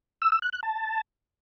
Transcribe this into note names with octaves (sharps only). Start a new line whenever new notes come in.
E6
E6
F#6
F#6
A5